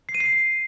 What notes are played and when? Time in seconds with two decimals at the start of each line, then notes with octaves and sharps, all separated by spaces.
0.09 C7
0.15 D#7
0.20 C7